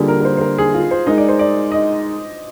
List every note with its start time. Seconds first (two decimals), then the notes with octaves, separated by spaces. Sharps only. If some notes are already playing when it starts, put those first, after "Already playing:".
Already playing: D3 G3 A#3 F4 G#4
0.08 A#4
0.21 A#4
0.25 C5
0.37 C5
0.41 A#4
0.58 G#4
0.74 F4
0.91 C5
1.07 G#3 D#4 A#4 D#5
1.18 D5
1.29 C5
1.39 D5
1.72 D#5